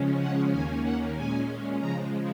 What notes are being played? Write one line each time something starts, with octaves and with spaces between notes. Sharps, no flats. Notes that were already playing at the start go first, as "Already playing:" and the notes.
Already playing: C#3 F3 G#3 C#4
F#5
D#2 D#3 A#3 C#4 G#5
F#5
A#2 G#3 C#4 G#5
C#3 F3 G#3 A#5